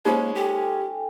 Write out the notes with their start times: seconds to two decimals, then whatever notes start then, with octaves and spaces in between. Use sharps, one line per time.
0.05 G#3 A#3 C#4 D#4 F4 C5
0.35 G4 A4 G5 G#5